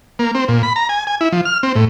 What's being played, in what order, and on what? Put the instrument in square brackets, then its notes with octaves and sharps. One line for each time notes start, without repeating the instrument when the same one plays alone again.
[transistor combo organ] A#3
C4
A#2
B5
A#5
G#5
G#5
E4
F3
F6
C4
A2